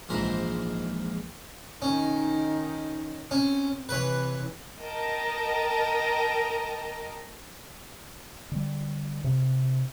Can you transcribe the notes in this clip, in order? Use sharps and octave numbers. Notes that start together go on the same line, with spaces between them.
A#1 G#2 E3 A#4 C5 B5
D#3 C#4 D#4
C4 C#4
C3 E3 B4 C#5
A#4 D#5 G5 A5 A#5
D3 G3
C3